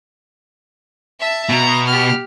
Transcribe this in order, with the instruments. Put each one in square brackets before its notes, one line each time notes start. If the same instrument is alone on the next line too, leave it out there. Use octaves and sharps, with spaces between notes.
[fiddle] E5 A5
[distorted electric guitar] B2 [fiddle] A#5
[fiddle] G4 F6